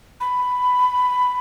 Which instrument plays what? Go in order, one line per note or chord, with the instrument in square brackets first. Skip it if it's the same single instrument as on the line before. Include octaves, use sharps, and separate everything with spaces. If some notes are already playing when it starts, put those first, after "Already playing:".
[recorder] B5